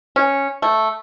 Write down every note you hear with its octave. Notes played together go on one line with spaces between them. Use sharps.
C#4
A3